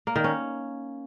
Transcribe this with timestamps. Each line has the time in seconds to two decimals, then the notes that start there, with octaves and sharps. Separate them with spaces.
0.07 A#3
0.16 D#3
0.24 C#4